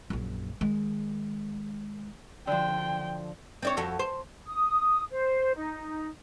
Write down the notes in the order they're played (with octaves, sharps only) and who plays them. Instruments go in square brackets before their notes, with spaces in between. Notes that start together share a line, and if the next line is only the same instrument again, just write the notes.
[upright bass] A#1 F#2
D#3 G#3
[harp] D3 F3 [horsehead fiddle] G5
[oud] C4 D4 C#5
F2 F#4 A4
C5
[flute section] D#6
C5
D#4